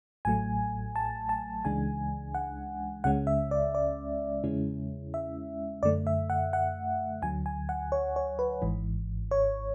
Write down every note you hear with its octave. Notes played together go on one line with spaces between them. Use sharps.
A1 A2 F#3 A3 G#5
A5
A5
C#2 C#3 E3 G#3 D4 G#5
F#5
C#2 C#3 G#3 C#4 F#5
E5
D5
D5
E2 C#3 G#3 C#4 E4
E5
F#2 D3 A3 D5
E5
F#5
F#5
D2 D3 F#3 G#5
G#5
F#5
C#5
C#5
B4
G#1 G#2 E3
C#5